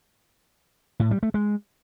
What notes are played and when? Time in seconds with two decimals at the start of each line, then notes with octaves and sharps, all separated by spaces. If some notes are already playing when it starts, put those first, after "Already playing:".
1.00 A2
1.11 G3
1.23 A3
1.34 G#3